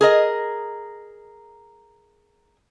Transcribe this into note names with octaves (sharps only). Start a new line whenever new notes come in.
G#4 A#4 D#5